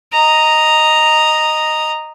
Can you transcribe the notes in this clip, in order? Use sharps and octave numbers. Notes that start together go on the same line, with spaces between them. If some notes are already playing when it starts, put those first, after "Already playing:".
D#5 A#5